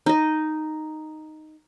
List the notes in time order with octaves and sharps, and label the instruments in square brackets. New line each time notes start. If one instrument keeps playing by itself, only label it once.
[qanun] D#4 D#5